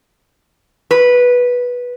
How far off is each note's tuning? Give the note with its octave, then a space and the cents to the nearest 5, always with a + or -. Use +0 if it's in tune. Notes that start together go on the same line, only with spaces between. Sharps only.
B4 -10